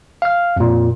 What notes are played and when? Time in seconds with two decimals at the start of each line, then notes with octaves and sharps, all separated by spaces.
0.22 F5 F6
0.56 F2 A#2